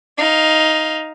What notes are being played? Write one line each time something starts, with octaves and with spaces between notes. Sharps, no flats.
D#4 F5